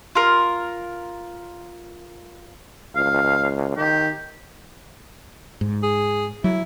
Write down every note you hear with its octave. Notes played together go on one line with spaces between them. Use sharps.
F4 A#4
C#2 F5
D#3 G4
G#2
G#4
F#3 E4